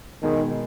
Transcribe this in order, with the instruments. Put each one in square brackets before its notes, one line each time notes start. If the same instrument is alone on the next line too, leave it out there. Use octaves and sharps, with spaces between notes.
[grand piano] B2 G#3 D#4 G#4 [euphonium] D#3